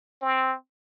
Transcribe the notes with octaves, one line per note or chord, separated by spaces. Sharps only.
C4